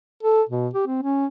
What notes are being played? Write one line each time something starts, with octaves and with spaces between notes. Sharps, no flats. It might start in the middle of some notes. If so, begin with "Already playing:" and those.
A4
B2
G4
C4
C#4